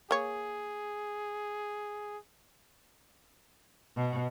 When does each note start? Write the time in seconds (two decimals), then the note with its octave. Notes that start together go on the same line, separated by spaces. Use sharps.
0.11 A#3 G#4 C#5
3.97 B2